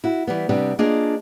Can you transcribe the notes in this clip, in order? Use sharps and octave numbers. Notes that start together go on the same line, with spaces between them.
E4 F#4
E3 G3 B3
C3 G3 B3 D4
A#3 D4 F4 G#4 D#5